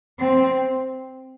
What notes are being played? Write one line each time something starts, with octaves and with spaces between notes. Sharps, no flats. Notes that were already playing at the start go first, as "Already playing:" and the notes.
C4